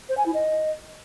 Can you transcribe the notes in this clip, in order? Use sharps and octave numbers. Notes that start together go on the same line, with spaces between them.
C5
G#5
E4
D#5